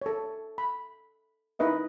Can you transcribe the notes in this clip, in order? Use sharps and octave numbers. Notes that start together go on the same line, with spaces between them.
A4 C#5
B5
D#4 E4 B4 D#5 E5